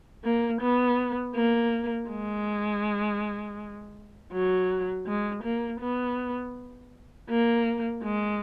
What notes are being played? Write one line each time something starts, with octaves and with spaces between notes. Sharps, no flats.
A#3
B3
A#3
G#3
F#3
G#3
A#3
B3
A#3
G#3